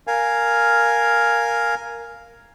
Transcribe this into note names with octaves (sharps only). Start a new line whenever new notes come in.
A#4 F5 G#5